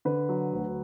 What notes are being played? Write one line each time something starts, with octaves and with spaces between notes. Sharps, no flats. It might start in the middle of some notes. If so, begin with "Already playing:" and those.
D3 B4
F#3
D2